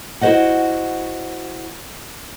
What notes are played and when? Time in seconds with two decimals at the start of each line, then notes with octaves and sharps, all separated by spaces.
0.21 E4 F#4 G#4 C5 D#5 F#5